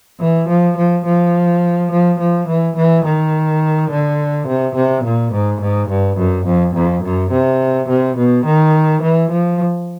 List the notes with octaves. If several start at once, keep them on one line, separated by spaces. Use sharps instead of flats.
E3
F3
F3
F3
F3
F3
E3
E3
D#3
D3
C3
C3
A#2
G#2
G#2
G2
F#2
F2
F2
F#2
C3
C3
B2
D#3
E3
F3